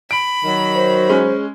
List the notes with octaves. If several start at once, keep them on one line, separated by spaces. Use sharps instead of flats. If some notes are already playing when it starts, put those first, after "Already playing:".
B5 D7
D#3 F#3
C5
G#3 C#4